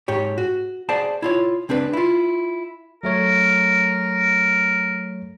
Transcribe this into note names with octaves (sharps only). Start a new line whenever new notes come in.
G#2 G4 C#5
F#4
G#4 C5 D5 F#5 A5
E4 F4 C#5
C#2 C4 D4 B4
E4 F4
F#3 A3 A#4 C#5